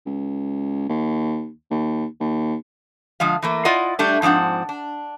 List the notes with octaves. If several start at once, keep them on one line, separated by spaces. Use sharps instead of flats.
C#2
D#2
D#2
D#2
D3 F3 G#3 F5
E3 A3 A#3
E4 F4 D5 D#5 F#5
G3 A3 D4
G#2 F3 C4 D4 F#5
D4